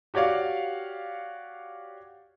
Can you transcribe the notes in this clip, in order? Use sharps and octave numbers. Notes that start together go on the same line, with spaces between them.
F#4 G4 C#5 D5 F5